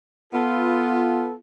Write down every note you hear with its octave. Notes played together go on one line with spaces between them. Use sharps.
B3 F4 A4